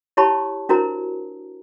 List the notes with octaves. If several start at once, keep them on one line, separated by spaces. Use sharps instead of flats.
E4 G4 C#5 A5 B5 C#6
D4 E4 F#4 A#4 C5 A#5